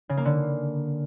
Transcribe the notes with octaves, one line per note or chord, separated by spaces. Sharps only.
C#3
A#3
D3